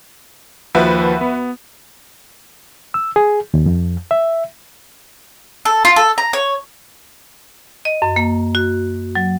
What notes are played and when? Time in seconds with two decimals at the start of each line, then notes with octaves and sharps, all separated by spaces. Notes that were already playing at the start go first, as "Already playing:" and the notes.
0.75 D#2 F3 F#4 B4 E5
1.21 B3
2.94 E6
3.16 G#4
3.54 D#2
3.66 F2
4.11 E5
5.65 A4
5.85 F4
5.96 A4
6.18 A#5
6.33 C#5
7.85 D#5
8.02 F#2
8.16 A#3
8.55 F#4
9.15 F#3